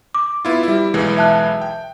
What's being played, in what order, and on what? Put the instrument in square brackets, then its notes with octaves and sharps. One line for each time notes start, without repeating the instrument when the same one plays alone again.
[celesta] D6
[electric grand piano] B3 E4 F4
G3 E4
B1 E3 G#3
[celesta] E5 A5 F#6
[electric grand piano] G5